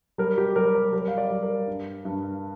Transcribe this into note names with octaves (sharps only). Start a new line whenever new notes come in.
G3 A#4
G4
G3 A#4
A#4
G3 A#4
F5
D5
G3
A#4
G2
G2